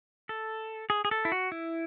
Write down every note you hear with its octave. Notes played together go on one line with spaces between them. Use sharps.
A4
G#4
G#4
A4
E4
F#4
E4